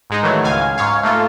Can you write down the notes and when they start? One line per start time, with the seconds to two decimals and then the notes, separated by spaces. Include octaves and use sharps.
0.10 G#2 G#3 D#4
0.23 D#3 E3 F#3 A3
0.44 C#2 F5 G#5
0.78 G#2 C#5 F5
1.03 A3 A#3 F4 A4